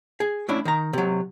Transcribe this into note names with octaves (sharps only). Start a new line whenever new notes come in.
G#4
A3 C#4 D4 E4
D#3 A#5
C3 F#3